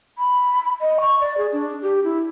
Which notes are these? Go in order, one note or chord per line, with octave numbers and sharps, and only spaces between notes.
B5
D#5
C#6
D5
G#4
D4
G4
E4